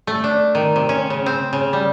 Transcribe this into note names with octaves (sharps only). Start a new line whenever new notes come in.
A3
D4
D#3
C3
C#4
C#3
C4
C#3
G3